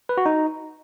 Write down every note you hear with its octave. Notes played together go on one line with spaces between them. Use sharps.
B4
F#4
D#4